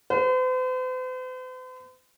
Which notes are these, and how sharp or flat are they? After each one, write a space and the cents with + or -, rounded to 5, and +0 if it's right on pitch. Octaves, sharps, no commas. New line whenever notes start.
C5 -45